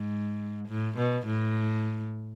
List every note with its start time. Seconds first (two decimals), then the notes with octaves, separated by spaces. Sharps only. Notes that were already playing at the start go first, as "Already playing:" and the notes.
Already playing: G#2
0.68 A2
0.97 B2
1.26 A2